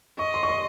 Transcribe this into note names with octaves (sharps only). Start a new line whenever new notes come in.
D#5 C#6
C6
C#6
C6